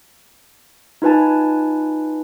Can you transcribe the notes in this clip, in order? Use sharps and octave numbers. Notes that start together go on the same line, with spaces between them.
D#4 F4 B4 G#5 A5